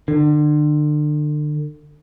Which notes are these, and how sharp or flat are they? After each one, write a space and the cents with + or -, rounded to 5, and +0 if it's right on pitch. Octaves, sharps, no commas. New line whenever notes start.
D3 +35